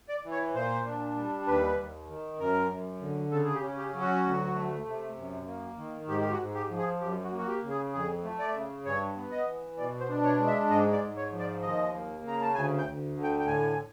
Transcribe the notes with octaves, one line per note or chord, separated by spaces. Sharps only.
D5
E3
C#5
A#2 C5
D4
G3
D#2 B4
D#2
D#3
F#2 A#4
F#2
D3
C#3 A4
G#4
G4
C#4
G4
F#3
F#4
D2
A3
C3
F#2
A#3
D#3
G#2 G4
G4
F#4
G#2
G4
F3
G#4
F#2 G4
F#4
A#3
F#4
G4
C#3
G#4
F2 G#4
A3
D5
C#3
G2 C#5
B3
D#5
E3
B2 D5
C5
D4
C#5
G#3
E5
G#2 D#5
D5
G#2
C#5
F3
D5
D#2 D#5
A#3
C#3 A#5
A5
D2 G#5
G5
D2
D3
G5
G5
A2 G#5